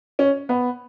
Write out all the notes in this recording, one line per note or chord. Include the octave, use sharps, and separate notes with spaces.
C#4
B3